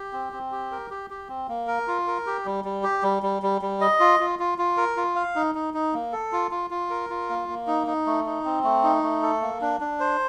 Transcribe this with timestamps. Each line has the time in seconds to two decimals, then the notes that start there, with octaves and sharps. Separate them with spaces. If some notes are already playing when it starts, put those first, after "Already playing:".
Already playing: G4
0.13 C4
0.33 C4
0.52 G4
0.71 A#4
0.91 G4
1.10 G4
1.29 C4
1.48 A#3
1.67 A#4
1.87 F4
2.07 A#4
2.27 G4
2.45 G3
2.64 G3
2.83 G4
3.03 G3
3.23 G3
3.42 G3
3.62 G3
3.81 D#5
4.00 F4
4.20 F4
4.39 F4
4.58 F4
4.77 A#4
4.97 F4
5.16 F5
5.36 D#4
5.55 D#4
5.74 D#4
5.93 A#3
6.12 A4
6.32 F4
6.51 F4
6.70 F4
6.90 A#4
7.10 F4
7.29 A#3
7.48 A#3
7.67 D#4
7.87 D#4
8.06 A3
8.26 D#4
8.45 C4
8.64 A3
8.84 D#4
9.03 A3
9.22 A4
9.41 A#3
9.61 D4
9.80 D4
10.00 C5